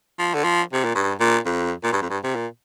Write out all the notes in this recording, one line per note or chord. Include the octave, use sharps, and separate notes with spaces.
F3
D3
F3
C3
A#2
G2
A#2
F2
A#2
G2
F2
G2
C3
A#2